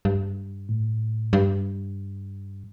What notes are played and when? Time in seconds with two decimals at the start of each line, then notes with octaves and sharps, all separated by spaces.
0.05 G2
0.69 A2
1.33 G2